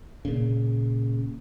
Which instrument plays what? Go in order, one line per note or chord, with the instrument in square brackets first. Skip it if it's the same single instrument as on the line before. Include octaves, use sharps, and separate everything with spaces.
[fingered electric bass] A#2 C#3